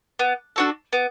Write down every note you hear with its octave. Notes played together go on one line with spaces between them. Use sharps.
B3
D4 F#4 A4
B3